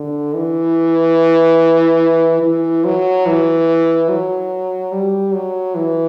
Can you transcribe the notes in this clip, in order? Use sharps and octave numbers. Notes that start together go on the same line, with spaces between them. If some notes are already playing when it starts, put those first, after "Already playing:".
Already playing: D3
E3
E3
F#3
E3
F#3
G3
F#3
E3